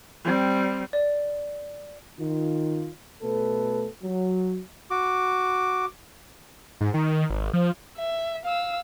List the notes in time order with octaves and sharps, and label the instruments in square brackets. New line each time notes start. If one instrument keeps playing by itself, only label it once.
[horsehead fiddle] G3 C4
[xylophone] D5
[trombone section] D#3 F4
B2 A3 A4 B4
F#3
[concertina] F#4 D6
[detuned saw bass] G#2
D#3
G#1
F3
[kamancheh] E5
F5 E6